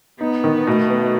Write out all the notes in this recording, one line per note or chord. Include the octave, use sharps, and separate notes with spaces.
B3 D#4
D#3
B2 A3
B3